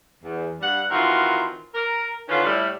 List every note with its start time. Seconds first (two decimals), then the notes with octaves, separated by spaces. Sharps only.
0.23 E2
0.61 G2 G3 F#5
0.91 D#3 E3 C4 F4 F#4 A#4
1.75 A#4
2.29 D3 D#3 C#4 F4 B4
2.44 A2 G3 E4